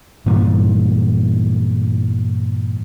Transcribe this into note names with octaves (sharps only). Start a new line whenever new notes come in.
G2 A#2 E3 G3